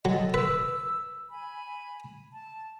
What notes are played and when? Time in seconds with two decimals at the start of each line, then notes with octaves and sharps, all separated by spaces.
0.05 F#3 A4 D#5
0.34 B4 E6
1.30 G#5 B5
2.31 A5